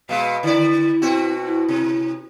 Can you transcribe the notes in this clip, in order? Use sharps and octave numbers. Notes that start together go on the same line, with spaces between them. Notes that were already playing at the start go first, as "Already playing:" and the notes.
B2 G#3 B4 F5
D3 E4 D5
B2 C4 F#4
E4
C3